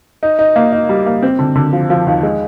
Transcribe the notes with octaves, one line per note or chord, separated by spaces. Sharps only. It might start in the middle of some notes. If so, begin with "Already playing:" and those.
D#4
D#4
A#3
D#4
G3
A#3
C4
D3
D3
F3
F3
D#2
G#3